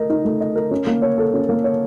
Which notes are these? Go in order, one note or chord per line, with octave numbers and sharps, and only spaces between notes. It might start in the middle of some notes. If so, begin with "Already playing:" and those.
Already playing: A3 A#4 D#5
D#4
A3
D#5
A#4
C#4
A#3
C#5
A4
C#4
A#3
C#5